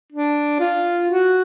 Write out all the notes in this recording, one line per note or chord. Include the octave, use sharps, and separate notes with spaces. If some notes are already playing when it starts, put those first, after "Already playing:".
D4
F4
F#4